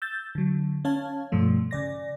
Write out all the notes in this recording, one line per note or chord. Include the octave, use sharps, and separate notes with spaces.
E6 G6 A6
D3 F#3
C#4 C#5 F5 A5
G2 B2 F3 A3
C#3 D5 A#6